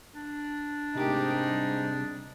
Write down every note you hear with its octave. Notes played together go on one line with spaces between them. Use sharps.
D4
G#2 C3 A3 D#4 G4 A#4
G3